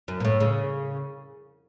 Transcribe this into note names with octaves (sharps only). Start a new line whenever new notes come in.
F#2
B2
A2
C#3